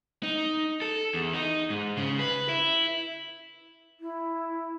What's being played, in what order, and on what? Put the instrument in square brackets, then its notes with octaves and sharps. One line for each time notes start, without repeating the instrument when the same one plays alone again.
[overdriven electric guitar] D#4
A4
E2
D#4
G#2
C#3
B4
E4
[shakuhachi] E4